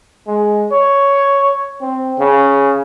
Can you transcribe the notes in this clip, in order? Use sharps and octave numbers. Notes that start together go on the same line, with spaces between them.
G#3
C#5
C4
C#3